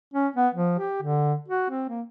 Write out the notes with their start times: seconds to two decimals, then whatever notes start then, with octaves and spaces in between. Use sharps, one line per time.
0.14 C#4
0.36 B3
0.54 F3
0.79 G4
1.03 D3
1.48 F#4
1.70 C4
1.89 A#3